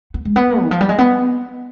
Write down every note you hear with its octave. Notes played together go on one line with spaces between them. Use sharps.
B3
G#3
B3
D#3
F3
G3
G#3
B3